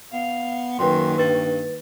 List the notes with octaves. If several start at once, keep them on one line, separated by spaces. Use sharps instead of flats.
B3 F5
F#2 D#3 A#3 B4 G5 C6
G2 B4 A6